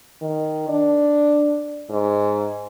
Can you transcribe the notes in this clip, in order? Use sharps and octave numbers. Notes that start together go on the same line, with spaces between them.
D#3
D4
G#2